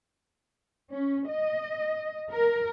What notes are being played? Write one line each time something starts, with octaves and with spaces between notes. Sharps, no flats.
C#4
D#5
A#4